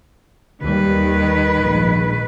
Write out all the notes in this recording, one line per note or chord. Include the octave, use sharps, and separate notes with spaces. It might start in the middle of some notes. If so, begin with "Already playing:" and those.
D#2 D#3 G3 B4
A#1 G#2